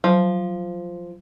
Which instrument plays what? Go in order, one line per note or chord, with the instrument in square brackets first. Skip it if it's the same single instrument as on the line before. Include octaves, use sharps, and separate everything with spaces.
[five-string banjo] F3 [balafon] F#3